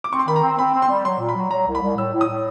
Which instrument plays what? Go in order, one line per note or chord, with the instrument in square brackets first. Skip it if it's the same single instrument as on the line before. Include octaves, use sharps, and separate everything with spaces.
[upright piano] D6
[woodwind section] C4 [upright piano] C#6
[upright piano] C6
[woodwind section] D#3 [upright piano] B5
[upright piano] A#5
[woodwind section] C4
[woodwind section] C4 [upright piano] B5
[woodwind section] C4
[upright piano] C6
[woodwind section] G3
[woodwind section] F#3 [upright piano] C6
[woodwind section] A#2
[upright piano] B5
[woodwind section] F#3
[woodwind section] F#3 [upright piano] A#5
[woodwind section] C2
[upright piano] B5
[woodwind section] C2
[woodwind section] A2 [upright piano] E6
[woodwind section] A2
[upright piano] D#6
[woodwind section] A2